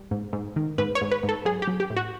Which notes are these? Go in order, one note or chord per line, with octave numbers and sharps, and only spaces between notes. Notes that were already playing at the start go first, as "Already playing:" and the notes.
Already playing: G3
G#2
G#2
D#3
G#2 B4
C#5
G#2
B4
G#2
A4
F#3 G#4
G4
F#3
G4
A2
F#4